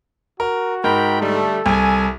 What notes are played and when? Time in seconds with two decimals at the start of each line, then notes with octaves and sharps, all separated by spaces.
0.40 F#4 A#4
0.84 G#2 A#4 G5 B5
1.21 D3 G3 A3 A4
1.66 C2 G#5